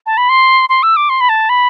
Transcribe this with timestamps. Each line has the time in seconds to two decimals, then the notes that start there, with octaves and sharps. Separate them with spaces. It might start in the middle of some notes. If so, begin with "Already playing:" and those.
0.06 A5
0.17 B5
0.29 C6
0.69 C6
0.83 E6
0.96 D6
1.09 C6
1.21 B5
1.29 A5
1.49 B5